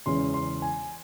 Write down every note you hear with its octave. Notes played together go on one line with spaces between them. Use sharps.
E2 C#3 E3 G#3 C#4 C6
C6
G#5